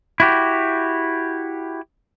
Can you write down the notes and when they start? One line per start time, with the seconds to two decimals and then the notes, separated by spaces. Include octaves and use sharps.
0.20 E4 F#4 G4